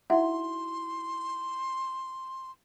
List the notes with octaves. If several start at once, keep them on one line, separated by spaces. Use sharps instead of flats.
D#4 E4 F#4 E5 F#5 C6